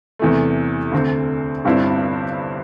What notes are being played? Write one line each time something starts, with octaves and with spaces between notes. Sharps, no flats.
E2 C3 E3 A3
D2 D3 C4
G1 G2 G3 C4 E4